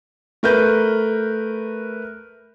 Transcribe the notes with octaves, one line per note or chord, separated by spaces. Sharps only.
A3 A#4 B4 G6